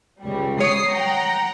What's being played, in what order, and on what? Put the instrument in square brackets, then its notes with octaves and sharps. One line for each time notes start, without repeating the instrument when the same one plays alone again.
[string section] C#2 G3
[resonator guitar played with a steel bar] C#5 [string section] D#6 C7
[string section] F#5 G5 A#5